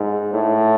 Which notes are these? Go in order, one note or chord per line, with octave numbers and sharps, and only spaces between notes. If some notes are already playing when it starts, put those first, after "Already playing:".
Already playing: G#2
A2